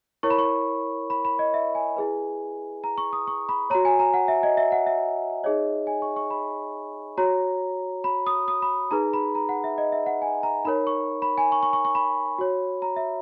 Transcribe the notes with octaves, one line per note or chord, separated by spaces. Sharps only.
E4 A#4 C#5 C#6
B5
C#6
B5
B5
D#5
E5
G#5
E4 G#4 B4
A#5
C#6
D#6
C#6
B5
F#4 C#5 A#5
G#5
A#5
F#5
E5
D#5
E5
F#5
E5
D#4 G#4 C#5 D#5
G#5
C#6
C#6
B5
F#4 C#5 A#5
B5
D#6
D#6
B5
D#4 G#4 B4 A#5
B5
A#5
F#5
E5
D#5
E5
F#5
G#5
A#5
D#4 A#4 C#5 B5
C#6
B5
G#5
C#6
C#6
C#6
C#6
B5
F#4 C#5
A#5
E5